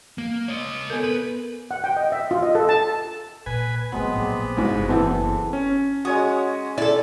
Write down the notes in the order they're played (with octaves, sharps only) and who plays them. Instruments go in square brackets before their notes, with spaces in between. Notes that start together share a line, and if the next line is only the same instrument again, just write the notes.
[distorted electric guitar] A#3
C#5 D#5
[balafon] B3 A4 A#4
[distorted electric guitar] B4
[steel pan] F#5
G5
D#5
E5
F4
D#5
A4
A5
[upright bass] A#2 [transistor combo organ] B4 G#5
[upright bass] A2 E3 [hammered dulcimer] F#3 G#3 C4 [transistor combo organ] B3
[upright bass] A#1 [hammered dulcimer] G4 G#4 D5
[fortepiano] C2 G#2 [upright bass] F#3
[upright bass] F#1
[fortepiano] E3 B3 C4 [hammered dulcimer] A4 C5 D5
[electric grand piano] C#4
[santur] G#3 C#5 D#6 [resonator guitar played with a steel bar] F#4
[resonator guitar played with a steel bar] E4 A4 [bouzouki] D5